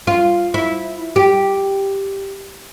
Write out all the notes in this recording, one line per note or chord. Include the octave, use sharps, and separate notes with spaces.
F4
E4
G4